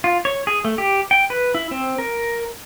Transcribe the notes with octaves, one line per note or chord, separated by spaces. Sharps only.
F4
C#5
G#4
A3
G4
G5
B4
E4
C4
A#4